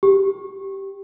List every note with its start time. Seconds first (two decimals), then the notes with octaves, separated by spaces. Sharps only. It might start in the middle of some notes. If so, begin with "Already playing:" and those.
0.03 G4